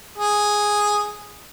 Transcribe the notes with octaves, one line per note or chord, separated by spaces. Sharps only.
G#4